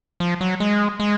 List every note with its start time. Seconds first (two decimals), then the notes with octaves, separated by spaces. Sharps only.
0.20 F3
0.41 F#3
0.60 G#3
1.00 G#3